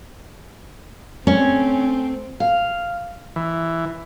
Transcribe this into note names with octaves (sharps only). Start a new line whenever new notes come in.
A3 C4 C#4
F5
E3